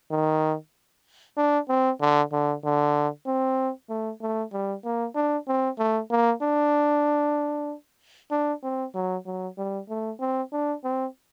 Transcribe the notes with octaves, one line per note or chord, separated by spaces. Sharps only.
D#3
D4
C4
D3
D3
D3
C4
A3
A3
G3
A#3
D4
C4
A3
A#3
D4
D4
C4
F#3
F#3
G3
A3
C4
D4
C4